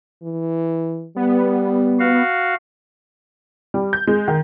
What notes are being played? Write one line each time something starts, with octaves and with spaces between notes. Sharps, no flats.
E3
G3 B3
F#4 F5
G3
G6
G#3
D#3